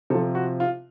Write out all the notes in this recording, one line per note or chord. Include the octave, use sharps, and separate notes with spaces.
C3 F3 A4
F#4
F4